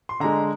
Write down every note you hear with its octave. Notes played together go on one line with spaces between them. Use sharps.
C6
D3 G#3 A#5